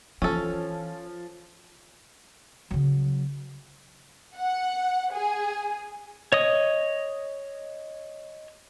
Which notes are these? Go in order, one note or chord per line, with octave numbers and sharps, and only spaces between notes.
E3 F3 C#4 A4
C#3 F#3
F#5
G#4
C#5 D#5 D#6